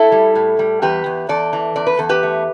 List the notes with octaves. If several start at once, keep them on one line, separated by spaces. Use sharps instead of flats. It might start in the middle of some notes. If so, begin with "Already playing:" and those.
Already playing: E4 A4
G3
A2
G3
E2 G4 B4
E2
E2 A4 D5
E3
E2 D5
B4
E2 A4
G4 B4
A3